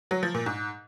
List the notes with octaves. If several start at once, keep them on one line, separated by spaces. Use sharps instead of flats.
F#3
F3
A#2
G#2